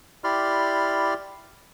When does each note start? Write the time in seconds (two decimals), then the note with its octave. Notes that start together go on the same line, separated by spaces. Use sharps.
0.24 E4 G4 D5 B5 C6 F6